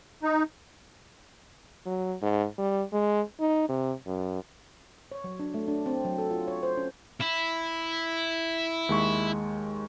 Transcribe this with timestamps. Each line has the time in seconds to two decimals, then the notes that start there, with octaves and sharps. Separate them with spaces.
0.23 D#4
1.86 F#3
2.22 G#2
2.58 G3
2.92 G#3
3.40 D#4
3.69 C3
4.07 F#2
5.12 C#5
5.24 F#3
5.40 D4
5.54 A3
5.68 D4
5.86 C4
6.05 F#3
6.18 A4
6.31 F4
6.48 C#5
6.63 C5
6.77 C#4
7.21 E4
8.89 D#2 G#3 C#6